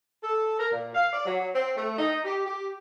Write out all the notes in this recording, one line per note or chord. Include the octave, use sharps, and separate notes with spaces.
A4
A#4
A#2
F5
D5
F#3
C4
A3
D#4
G4
G4